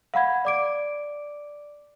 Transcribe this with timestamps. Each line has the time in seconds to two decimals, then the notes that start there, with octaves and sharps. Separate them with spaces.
0.14 F5 F#5 B5 G#6
0.45 D5 D6 D7